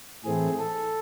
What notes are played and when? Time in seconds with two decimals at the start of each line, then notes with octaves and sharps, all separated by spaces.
0.25 A2 E3 A3 C4 G#4
0.59 A4